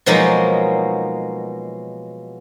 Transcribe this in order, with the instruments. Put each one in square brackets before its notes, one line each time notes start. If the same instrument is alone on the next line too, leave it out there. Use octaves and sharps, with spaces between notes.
[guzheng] B2 F3 F#3 G#3 A#3 D#4